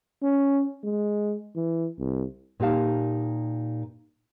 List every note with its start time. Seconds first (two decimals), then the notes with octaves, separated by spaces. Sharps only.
0.23 C#4
0.84 G#3
1.56 E3
1.98 C2
2.60 A#2 D#4 G4 F5 A5